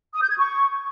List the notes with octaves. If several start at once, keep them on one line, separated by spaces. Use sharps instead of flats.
D#6
G6
G#6
C#6